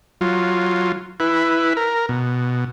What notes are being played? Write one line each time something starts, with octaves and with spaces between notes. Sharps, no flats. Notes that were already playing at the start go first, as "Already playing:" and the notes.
F#3 F4
E4 B4
A#4
B2